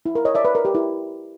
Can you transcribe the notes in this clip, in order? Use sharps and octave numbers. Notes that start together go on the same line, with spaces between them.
E4
A#4
C#5 D#5
D5 E5
B4
A#4
G4
E4